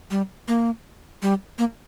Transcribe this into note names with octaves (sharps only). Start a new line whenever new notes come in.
G3
A#3
G3
A#3